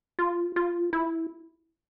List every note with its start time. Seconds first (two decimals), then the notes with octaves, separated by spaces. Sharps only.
0.19 F4
0.56 F4
0.93 E4